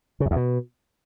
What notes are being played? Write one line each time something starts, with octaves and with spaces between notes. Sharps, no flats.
C#3
F#2
E2
B2